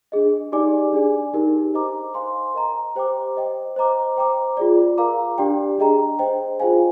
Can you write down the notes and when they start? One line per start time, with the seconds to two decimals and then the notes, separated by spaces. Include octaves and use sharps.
0.12 D4 G#4 D#5
0.52 D#4 G4 D5 G#5 D6
0.93 D4 G#4 D5 G#5
1.34 D#4 G4 A#4
1.74 C5 D#5 A#5 D6
2.14 C5 F5 G#5 C6
2.54 A#4 D#5 A#5
2.95 G4 C5 G5 A#5 D6
3.36 C5 D#5 G5
3.76 C5 D#5 A#5 D6
4.17 C5 G5 A#5 D6
4.57 F4 G#4 D5
4.98 A#4 F5 A#5 D6
5.38 D4 G4 D5 G5
5.78 D4 G#4 D#5 G5 A#5
6.19 C5 D#5 G5
6.60 F4 G#4 C5 F5 G#5